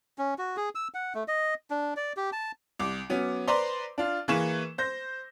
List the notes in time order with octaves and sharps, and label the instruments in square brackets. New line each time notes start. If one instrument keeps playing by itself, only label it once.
[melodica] C#4
F#4
G#4
E6
F#5
A3
D#5
D4
D5
G4
A5
[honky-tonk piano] C2 D6
F#3 B3 C#4
B4 C5 D5 A#5 C6
D4 F4
E3 A#3 G#4 B4 C#6 E7
C5 G6 A#6